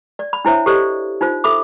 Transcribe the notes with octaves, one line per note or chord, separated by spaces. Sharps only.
D5
B5
D4 E4 C5 C#5 E5
G4 A4 C5 D5 D#5
D#4 F4 C5
A4 E5 B5 D6